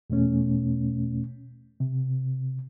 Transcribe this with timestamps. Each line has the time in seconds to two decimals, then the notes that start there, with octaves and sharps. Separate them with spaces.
0.10 E2 B2 A3 C#4
1.80 C3